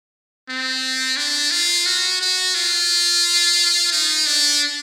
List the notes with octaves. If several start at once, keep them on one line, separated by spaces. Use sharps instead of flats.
C4
D4
F4
F#4
F#4
F4
D#4
D4